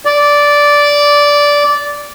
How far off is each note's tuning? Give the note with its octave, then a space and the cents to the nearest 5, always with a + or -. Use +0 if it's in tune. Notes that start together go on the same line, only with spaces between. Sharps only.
D5 -10